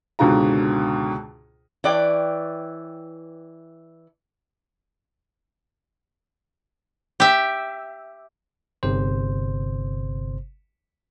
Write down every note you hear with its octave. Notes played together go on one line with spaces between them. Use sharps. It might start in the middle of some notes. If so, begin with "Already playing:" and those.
C#2 G#2 B2 D3 F4 A#5
E3 C#5 D5 G5
G4 E5
G1 C3 C5